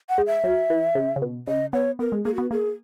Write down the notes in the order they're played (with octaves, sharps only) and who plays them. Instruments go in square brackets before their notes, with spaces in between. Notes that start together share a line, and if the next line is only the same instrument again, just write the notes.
[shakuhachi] F#5
[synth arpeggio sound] G#3
[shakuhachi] E5
[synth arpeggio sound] F#3
E3
C#3
C#3
B2
[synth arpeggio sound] C#3 [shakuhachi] D#5
[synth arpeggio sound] B3 [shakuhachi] C#5
[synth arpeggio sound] B3 [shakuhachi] A#4
[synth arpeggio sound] G#3
[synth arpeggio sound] A#3 [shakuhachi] G#4
[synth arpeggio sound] B3 [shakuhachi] F#4
[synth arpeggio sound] A#3 [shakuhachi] G#4